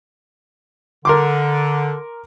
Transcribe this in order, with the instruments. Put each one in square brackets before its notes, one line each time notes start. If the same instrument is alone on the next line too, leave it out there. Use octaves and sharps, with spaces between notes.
[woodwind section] D3 [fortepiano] A#4 C6 D6